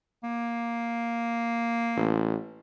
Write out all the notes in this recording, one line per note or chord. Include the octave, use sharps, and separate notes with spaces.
A#3
A1